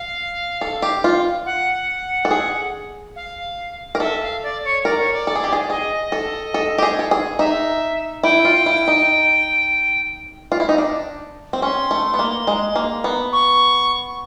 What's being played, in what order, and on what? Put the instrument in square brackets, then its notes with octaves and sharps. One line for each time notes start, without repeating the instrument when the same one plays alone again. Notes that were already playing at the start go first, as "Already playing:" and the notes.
Already playing: [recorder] F5
[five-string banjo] A4
G4
F4
[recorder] F#5
[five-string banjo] A4
G#4
[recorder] F5
[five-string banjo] A#4
[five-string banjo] A4 [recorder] E5
[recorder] F5
D5
C#5
[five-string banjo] A#4 [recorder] D5
[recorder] C#5
D5
[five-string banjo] A4
G#4
G4
G#4
[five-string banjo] G#4 [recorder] D#5
[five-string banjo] A4
A4
G4
G#4
A4
G#4
[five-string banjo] D#4 [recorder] E5
[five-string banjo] E4 [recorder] G5
[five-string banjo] F4
E4
D#4
F4
E4
D#4
D4
C4
[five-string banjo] C#4 [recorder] C6
[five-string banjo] A3
B3
A#3
G#3
A#3
B3
[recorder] C#6